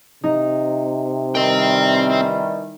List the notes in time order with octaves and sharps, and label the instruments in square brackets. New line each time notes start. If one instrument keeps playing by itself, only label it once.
[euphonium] C3 [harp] D#4
[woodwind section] D#3 E3 G3 [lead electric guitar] C4 G5